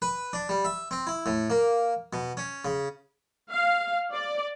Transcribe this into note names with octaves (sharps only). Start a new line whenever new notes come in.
B4
D4
G3
E5
C4
E4
A2
A#3
B2
C#4
C#3
F5
D5